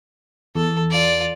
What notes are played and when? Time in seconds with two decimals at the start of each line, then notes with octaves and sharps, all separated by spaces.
0.55 E2 A4
0.91 F4 D5